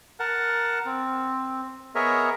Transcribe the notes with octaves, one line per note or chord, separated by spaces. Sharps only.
A#4 F#5 A5
C4
B3 G#4 A#4 C#5 D#5 E5